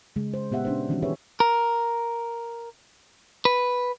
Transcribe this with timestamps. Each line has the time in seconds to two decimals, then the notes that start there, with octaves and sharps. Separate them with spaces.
0.16 C#3 G#3
0.34 C5
0.51 A#2 B3 G4 E5 F#5
0.65 C#4 D4 C5
0.89 D#3 E3 G3 C#4 D#4 F#4
1.02 G4 G#4 B4 C#5 E5
1.40 A#4
3.45 B4